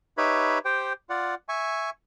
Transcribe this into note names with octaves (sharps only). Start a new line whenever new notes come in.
D#4 G4 B4 C#5 E5 B5
G4 C5 G5
F4 D5 F#5
E5 G#5 C#6